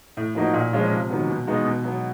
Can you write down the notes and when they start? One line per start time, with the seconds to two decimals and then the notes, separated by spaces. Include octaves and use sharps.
0.17 A2
0.35 F3 A#3 D#4 F#4
0.54 A#2
0.73 F3 G#3 C#4 F4
0.91 C3
1.10 D#3 F#3 B3
1.28 B2
1.47 G#3 B3 D#4 F#4
1.65 B2
1.84 F#3 B3